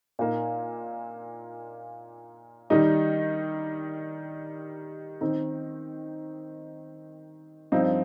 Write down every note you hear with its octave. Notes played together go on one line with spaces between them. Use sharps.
A#2 A#3 D#4
D#3 G3 D#4
D#3 C4 D#4
G2 F3 C4 D#4